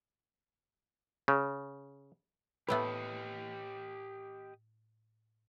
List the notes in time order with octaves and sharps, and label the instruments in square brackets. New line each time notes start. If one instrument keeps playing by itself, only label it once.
[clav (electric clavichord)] C#3
[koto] A2 A3 B3 [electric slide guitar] G4 D#5 [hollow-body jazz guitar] B4